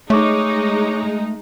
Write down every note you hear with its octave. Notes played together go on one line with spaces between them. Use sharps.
G#3 A3 D#4 C#5 C#6 D6